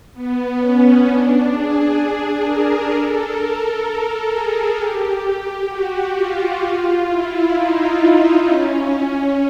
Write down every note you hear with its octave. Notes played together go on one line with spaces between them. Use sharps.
B3
C#4
D4
G#4
A#4
A4
A#4
A#4
A#4
G#4
G4
F#4
F4
F4
E4
D#4
C#4